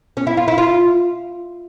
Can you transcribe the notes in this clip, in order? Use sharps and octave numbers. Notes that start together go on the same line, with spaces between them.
C#4
E4
F4
E4
F4